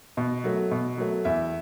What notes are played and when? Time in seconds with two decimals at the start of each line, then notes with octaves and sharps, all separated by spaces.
0.17 B2
0.44 F#3 A3
0.71 B2
0.98 F#3 A3
1.25 E2 E5